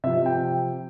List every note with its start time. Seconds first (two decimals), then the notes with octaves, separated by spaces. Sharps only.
0.04 C3 F3 E5
0.26 G5